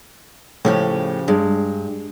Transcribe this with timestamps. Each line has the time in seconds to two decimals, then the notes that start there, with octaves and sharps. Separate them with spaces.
0.65 A2 C#3 F3 G4
1.28 G2 G#3